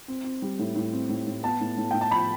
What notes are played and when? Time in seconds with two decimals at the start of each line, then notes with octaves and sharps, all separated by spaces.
0.08 C4
0.24 C4
0.42 G3
0.59 A2
0.76 A2
0.93 C4
1.09 A2
1.27 A2
1.43 B3 A5
1.60 A2
1.77 A2
1.91 A2 G5
2.01 A5
2.11 F3 B5